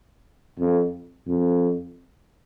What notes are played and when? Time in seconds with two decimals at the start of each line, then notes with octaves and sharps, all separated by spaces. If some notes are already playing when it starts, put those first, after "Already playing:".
0.59 F2
1.28 F2